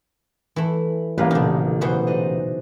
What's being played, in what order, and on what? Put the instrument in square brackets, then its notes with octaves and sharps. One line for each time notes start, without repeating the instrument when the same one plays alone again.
[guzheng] E3 A3 [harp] E4
[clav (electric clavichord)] A1 A#3 [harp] A2 G3 G#3 [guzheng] B4 F5
[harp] B1 A#2 C#3 [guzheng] D4 D#4
[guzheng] B2 E3 G#4 [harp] F#4 C5
[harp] D4 D#4 D#5